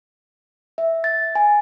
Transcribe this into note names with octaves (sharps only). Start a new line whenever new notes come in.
E5
A6
G#5